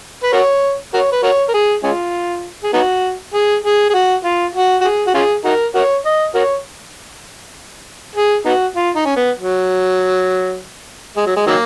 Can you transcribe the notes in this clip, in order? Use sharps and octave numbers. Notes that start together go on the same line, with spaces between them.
B4
F#4 A#4 C#5
F#4 A#4 C#5
B4
F#4 A#4 C#5
A#4
G#4
G#3 C#4 F4
G#4
B3 D#4 F#4
G#4
G#4
G#4
F#4
F4
F#4
F#4
G#4
F#4
C#4 F4 G#4
D#4 F#4 A#4
F#4 A#4 C#5
D#5
F#4 A#4 C#5
G#4
B3 D#4 F#4
F4
D#4
C#4
B3
F#3
G#3
F#3
G#3
D#3 F#3 A#3